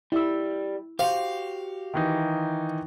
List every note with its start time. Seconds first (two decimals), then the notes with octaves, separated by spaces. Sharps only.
0.12 G3 E4 E6
0.99 F#4 G4 C5 F5
1.94 D#3 E3 D#4